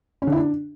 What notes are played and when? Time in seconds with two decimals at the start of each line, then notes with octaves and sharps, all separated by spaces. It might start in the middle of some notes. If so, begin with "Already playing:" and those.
0.22 C#4
0.27 D3
0.32 E4
0.37 D4